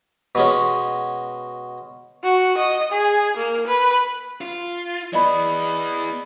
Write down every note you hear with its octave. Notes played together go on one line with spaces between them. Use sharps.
B2 G#3 C#4
F#4
D#5
G#4
A#3
B4
F4
E3 B3 D5 D#5 B5